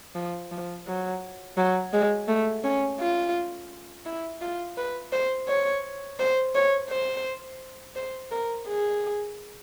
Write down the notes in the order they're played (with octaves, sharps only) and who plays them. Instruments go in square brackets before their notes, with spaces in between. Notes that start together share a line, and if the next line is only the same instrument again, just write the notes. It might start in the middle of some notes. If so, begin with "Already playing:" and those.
[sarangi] F3
F3
F#3
F#3
G#3
A3
C#4
F4
E4
F4
B4
C5
C#5
C5
C#5
C5
C5
A#4
G#4